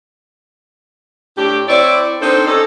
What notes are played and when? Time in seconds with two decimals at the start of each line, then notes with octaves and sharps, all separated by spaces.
1.37 A2 D4 G4
1.68 C4 E4 C#5 D5
2.21 C4 D4 D#4 A4 C5
2.47 C#4 D#4 A4